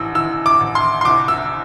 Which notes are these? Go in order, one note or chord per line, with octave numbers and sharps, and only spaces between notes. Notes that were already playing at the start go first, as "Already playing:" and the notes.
Already playing: A1 E3 E6
E3 E6
D6
A1
C6
C6
C2 D6
E6